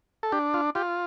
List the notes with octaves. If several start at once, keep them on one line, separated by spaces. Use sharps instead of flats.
A4
D4 G4
F4
F4 G4